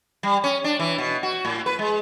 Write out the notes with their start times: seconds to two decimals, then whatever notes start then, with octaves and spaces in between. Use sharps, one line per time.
0.23 G3
0.44 C#4
0.64 D4
0.79 E3
0.98 B2
1.23 F#4
1.45 A2
1.66 B4
1.79 G#3